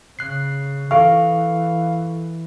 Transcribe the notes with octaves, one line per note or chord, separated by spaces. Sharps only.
C#3 F#6 C7
E3 A4 F5 C#6